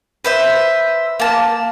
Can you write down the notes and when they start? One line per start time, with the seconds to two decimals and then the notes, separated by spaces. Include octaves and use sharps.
0.25 B4 C5 E5
1.20 A#3 A5